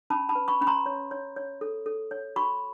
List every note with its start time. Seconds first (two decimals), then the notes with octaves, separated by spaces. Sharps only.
0.10 C#4 A5 B5
0.29 A5 B5
0.35 B4
0.48 B5 C#6
0.61 C#4 B5
0.67 A#5 C6
0.86 C#5
1.11 C#5
1.36 C#5
1.61 A4
1.86 A4
2.11 C#5
2.36 F#4 B5 C#6